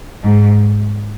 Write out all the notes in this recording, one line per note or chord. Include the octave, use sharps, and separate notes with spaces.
G#2